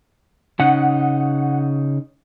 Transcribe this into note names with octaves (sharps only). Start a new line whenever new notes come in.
C#3 D#4 F#5